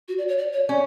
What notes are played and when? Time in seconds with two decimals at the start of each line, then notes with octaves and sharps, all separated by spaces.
0.08 F#4
0.18 D5
0.28 C#5
0.38 D5
0.53 C#5
0.68 C#4 D5